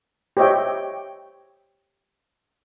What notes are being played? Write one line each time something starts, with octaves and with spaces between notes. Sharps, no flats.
G4 C5 C#5 D#5 E5 G5